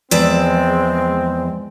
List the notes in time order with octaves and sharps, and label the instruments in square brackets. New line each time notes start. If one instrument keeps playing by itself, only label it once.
[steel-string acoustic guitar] E2 D5 E5 [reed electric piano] F3 [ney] G#3 [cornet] C4